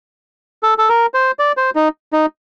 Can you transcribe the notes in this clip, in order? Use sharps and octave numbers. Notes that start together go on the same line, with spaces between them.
A4
A4
A#4
C5
D5
C5
D#4
D#4